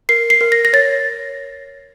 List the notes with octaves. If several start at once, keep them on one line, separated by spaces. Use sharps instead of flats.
A#4 C7
C7
A#4
A#6
A#6
C#5 A6